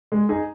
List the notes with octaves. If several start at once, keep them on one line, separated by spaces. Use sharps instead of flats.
G#3
D#4 G#4